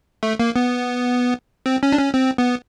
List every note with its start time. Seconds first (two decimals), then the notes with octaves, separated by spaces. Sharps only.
0.23 A3
0.40 A#3
0.56 B3
1.66 C4
1.83 C#4
1.92 D4
1.99 C#4
2.14 C4
2.38 B3